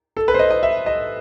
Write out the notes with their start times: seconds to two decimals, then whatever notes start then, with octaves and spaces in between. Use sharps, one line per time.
0.17 A4
0.28 B4
0.34 C5
0.39 D#5
0.51 D#5
0.63 E5
0.86 D#5